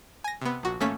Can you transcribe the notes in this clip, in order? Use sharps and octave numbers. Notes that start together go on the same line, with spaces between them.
G#5 A#6
C3 B3
A#1 F#4
G#1 A3 A#3 C#4 B6